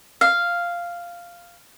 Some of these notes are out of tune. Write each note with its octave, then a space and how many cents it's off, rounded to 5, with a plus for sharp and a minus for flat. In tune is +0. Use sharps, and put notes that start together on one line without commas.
F5 -5